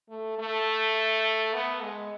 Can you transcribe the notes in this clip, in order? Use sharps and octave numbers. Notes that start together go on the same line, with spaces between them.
A3
A3
B3
G#3